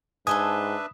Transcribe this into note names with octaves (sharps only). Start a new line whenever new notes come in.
G#2 D4 A4 B4 C5 E5 G#5 D#6